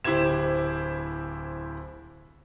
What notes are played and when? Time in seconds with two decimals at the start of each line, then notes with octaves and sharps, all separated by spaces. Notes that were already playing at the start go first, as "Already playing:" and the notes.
0.04 D1 E4 G4 C5 G#6 E7